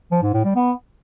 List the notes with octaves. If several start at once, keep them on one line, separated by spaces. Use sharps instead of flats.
F3
G#2
A2
G3
B3